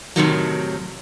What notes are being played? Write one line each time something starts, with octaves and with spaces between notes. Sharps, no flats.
A2 C3 D#3 F#3